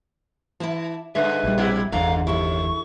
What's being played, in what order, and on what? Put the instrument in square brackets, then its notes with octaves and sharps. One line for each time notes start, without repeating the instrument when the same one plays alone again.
[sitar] E3 [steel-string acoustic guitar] E4 A5
[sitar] G2 D3 G#3 [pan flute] B4 [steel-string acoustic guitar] E5
[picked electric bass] A#1 G3
[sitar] B2 E4
[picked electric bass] G1 E2 [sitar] G#2 D3 [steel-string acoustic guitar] D4 A#5 [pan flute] F5
[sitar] D#2 [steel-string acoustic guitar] E4 A4 [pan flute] C#6